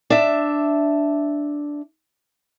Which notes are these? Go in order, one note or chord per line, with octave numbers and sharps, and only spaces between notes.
D4 E5